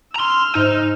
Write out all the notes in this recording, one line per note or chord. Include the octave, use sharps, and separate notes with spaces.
A#5 C6 E6 F6
G#2 D#4